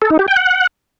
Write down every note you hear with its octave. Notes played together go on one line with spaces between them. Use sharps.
A4
D#4
G4
G5
F#5